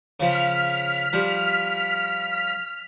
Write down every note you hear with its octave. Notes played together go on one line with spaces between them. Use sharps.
C#3 F3 F6 B6
F3 G3